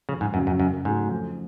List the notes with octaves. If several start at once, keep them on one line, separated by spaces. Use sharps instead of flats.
F2 C#3
G#2
F#2 C#3 F#3 C#4
F#2
F#2 C#3
G#2 F#3 A3
F2